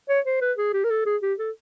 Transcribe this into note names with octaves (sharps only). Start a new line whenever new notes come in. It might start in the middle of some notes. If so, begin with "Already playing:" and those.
C#5
C5
B4
G#4
G4
A#4
A4
G#4
G4
A4